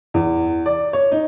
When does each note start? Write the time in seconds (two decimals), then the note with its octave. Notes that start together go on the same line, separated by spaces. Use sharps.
0.14 E2
0.66 D5
0.93 C#5
1.12 D#4